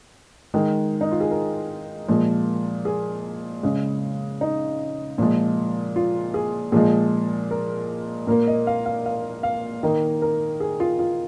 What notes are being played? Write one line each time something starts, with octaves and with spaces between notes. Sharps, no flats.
D#3 G#3
D#4
F4
G#4
A#4
A#2 F3 G#3
G#4
C#3 G#3
D#4
A#2 F3 G#3
F4
G#4
A#2 F3 G#3 G#4
A#4
A#2 A#3 A#4
D#5
F5
F5
F5
F5
D#3 A#3 D#5
A#4
G#4
F4
F4